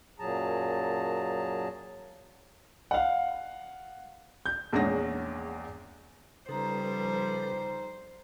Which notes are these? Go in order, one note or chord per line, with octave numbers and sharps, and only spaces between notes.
F#2 A#2 F#3 G#4 A5 A#5
F5 F#5
G6
A#1 E2 G#3 C#4 F#5 A#6
C#3 F3 G3 D#4 A4 B4 C5 A#5